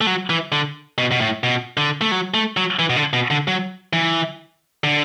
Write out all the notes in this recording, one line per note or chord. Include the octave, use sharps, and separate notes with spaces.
A3
F#3
E3
D3
B2
B2
A2
B2
D3
A3
F#3
A3
F#3
E3
B2
D3
B2
D3
F#3
E3
D3